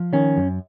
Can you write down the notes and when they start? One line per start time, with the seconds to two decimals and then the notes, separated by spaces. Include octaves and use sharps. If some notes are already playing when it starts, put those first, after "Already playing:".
Already playing: F3
0.13 D#3 C#4
0.37 F#2